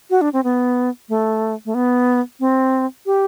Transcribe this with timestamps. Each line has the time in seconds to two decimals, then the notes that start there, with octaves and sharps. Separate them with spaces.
0.10 F#4
0.21 D4
0.33 C4
0.44 B3
1.09 A3
1.65 A3
1.74 B3
2.40 C4
3.06 G4